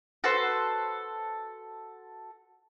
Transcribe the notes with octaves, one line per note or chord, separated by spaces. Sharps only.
F#4 A4 B4 C5